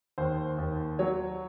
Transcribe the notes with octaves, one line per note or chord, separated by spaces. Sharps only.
D#2 C5
D#2
F#3 C#5